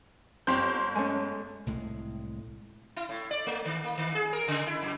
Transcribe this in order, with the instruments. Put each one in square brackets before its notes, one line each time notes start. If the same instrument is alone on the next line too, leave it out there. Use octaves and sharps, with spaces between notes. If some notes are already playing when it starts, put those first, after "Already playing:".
[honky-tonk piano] G1 C6 G6 [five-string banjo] C4 G4
[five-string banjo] G#3 A3 C#4
[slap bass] C2 A2 G#3
[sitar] E4
A2
D5
A3
D#3
A#3
D#3
G#4
A#4
C#3
E4
F#2